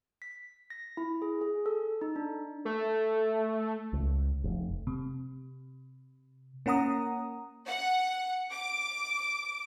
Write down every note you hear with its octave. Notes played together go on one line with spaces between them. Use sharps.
B6
A#6
E4
G#4
G#4
A4
D#4
D4
A3
C#2
F1
C3
A#3 C#4 F#5 A#5 D#6
F#5
D6